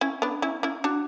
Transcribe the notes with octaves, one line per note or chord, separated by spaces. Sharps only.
C#4 E4
B3 D4
C#4 E4
C#4 E4
D4 F#4